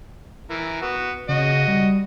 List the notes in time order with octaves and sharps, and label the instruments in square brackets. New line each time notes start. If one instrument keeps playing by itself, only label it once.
[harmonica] E3 A#4
B3 F#4
[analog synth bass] C#3 [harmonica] F#4 D#5
[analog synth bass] G3